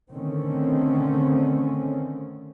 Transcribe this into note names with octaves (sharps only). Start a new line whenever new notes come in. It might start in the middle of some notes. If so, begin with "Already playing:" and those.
D3 D#3 A3 C4 C#4